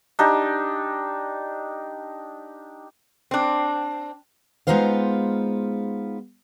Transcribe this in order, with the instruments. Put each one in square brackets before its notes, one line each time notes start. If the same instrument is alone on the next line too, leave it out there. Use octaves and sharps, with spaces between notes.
[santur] D4 D#4 G4
[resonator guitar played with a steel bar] C4 D4
[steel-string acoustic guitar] G#3 B3 D#4 F4 C5 F5